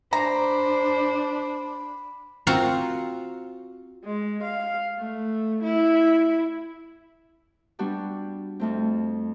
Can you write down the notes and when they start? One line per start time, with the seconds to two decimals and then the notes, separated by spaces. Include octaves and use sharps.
0.13 D4 C5 A#5 B5
2.47 C4 F4 F#4 F5 F#5 A#5
4.05 G#3
4.44 F5
4.99 A3
5.64 E4
7.79 G3 B3 D4 F#4 G4
8.60 F2 A3 C4